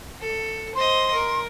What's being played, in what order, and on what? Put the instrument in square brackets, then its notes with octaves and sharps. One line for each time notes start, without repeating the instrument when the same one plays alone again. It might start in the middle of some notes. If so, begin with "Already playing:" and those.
[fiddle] A4
[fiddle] C5 D#5 [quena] C6
[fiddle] A#4